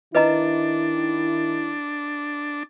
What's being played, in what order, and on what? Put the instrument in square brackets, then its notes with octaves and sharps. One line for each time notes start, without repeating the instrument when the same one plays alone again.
[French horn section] D#3 E4 [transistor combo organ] D4 [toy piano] B4 D#5 A#5